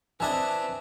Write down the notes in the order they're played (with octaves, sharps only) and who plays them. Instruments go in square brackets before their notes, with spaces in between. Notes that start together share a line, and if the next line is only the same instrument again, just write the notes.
[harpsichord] E3 D4 D#5 [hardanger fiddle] C4 E5 [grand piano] G#5 A5